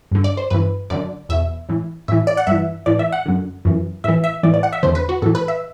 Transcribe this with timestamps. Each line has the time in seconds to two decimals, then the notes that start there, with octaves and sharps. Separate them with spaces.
0.11 G2 D3
0.24 D5
0.37 C5
0.50 G2 E3 B4
0.90 F#2 D3 D5
1.29 E2 B2 E5
1.69 A2 E3
2.08 A2 E3 E5
2.27 D5
2.37 F#5
2.47 G2 E3 E5
2.86 A2 E3 D5
2.99 E5
3.12 F#5
3.26 F#2 D3
3.65 F#2 E3
4.04 A2 E3 E5
4.24 E5
4.43 A2 E3 D5
4.54 D5
4.63 F#5
4.73 E5
4.83 E2 D3 C5
4.95 B4
5.09 F#4
5.22 A2 E3 A4
5.35 B4
5.48 E5